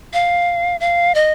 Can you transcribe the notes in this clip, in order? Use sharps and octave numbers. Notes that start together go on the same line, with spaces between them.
F5
F5
D#5